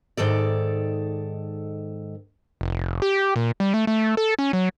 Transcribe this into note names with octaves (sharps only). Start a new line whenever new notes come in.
G#2 D#3 A4 D5
F1
G4
A#2
G3
A3
A3
A4
C#4
F#3